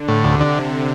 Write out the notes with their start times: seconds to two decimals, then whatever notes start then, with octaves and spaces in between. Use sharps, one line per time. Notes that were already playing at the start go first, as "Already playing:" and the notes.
Already playing: D3
0.08 A2
0.24 D2 C3
0.40 D3